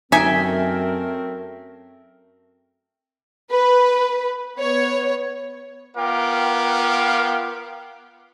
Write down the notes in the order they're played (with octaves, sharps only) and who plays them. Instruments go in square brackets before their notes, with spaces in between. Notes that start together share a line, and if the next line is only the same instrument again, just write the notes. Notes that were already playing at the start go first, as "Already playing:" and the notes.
[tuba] F#2 [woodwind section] A3 C4 A#4 [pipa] D#4 G#5 [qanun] E5 G5
[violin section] B4
B3 C#5
[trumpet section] B3 F4 A#4 F5 G5 D6